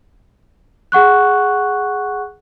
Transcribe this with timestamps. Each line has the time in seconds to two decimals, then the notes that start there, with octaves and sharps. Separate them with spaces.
0.92 G#4 F#5 C#6 F#6